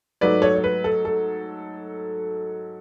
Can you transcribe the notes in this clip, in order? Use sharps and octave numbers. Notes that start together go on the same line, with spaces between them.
G#2 F#3 A3 B4 D5
A4 C#5
C#5
B4
A4
A4